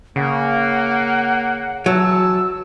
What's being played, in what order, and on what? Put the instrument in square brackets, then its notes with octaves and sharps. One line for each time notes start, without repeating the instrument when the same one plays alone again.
[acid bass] C#3 [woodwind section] A#3 [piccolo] F#5
[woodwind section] E3 A5 [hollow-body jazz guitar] F#3 [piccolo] E6